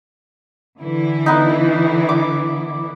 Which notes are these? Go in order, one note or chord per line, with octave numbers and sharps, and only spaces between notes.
D3 E3 E4
B3 D#4
D6